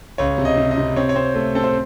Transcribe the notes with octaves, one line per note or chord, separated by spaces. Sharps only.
C#2 C#5
C3
D#5
C3
D#5
C3
C4 C#5
C#5
C4 C5
A3
C4 A4
C5